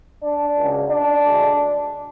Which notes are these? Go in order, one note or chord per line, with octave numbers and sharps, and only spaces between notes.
D4
C#2 C#3 F#3
D4
D2 D3 G#3